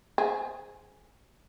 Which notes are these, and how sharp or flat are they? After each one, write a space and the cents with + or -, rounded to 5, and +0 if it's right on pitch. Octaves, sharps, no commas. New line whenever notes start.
G#4 +5 C5 -15 G5 +45